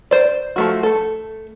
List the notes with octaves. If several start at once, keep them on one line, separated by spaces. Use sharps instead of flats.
C5 D5
F3 A3 F#4
A3 A4